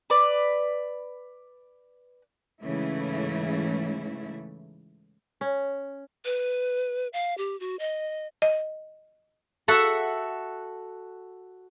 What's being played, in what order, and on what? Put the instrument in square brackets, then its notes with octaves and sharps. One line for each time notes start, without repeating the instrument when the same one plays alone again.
[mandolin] B4 D5
[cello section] G#2 C#3 E3 A3 E4
[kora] C#4
[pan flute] B4
F5
G4
F#4
D#5
[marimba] D#5
[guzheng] F#4 A4 E5 F#5